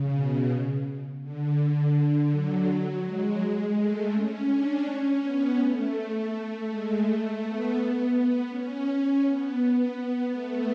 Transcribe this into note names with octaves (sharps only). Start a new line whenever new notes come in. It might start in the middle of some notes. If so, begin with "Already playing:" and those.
Already playing: C#3
B2
D3
F#3
F#3
G#3
A3
C#4
D4
C#4
B3
A3
A3
G#3
A3
B3
C#4
C#4
B3
A3